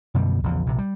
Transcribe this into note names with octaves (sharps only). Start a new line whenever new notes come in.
F#2 B2 D3 G3
A#1 E2 C#3
A#1 C3
G3